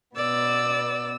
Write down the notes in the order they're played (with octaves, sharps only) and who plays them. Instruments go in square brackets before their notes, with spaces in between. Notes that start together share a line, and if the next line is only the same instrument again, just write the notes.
[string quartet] B2 B3 E6 [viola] D5